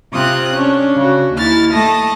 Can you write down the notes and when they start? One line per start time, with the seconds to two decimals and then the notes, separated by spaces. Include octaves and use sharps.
0.13 C3 C4 F4 D#6 F#6
0.55 C#4 D4
0.95 C#3 F#4
1.35 D#2 E4 F6 A6
1.72 A3 A5 D#6 A#6